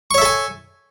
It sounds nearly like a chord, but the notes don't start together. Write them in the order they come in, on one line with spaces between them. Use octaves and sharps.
C#6 C#5 E5 A4 G#5